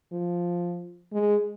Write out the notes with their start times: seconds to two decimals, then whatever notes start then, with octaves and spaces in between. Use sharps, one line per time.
0.12 F3
1.13 G#3